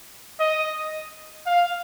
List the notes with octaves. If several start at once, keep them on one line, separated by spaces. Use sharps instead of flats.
D#5
F5